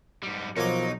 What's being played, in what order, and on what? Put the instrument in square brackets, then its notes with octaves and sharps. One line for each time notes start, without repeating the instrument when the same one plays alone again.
[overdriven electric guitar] G#2 G3
[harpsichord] B1 F#3 D6 [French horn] F3 [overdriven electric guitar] D#4 [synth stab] A#4 C5 C#5